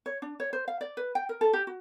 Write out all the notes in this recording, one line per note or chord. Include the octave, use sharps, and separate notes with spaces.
C#5
D4
C#5
C5
F5
D5
B4
G5
A#4
A4
G4
F#4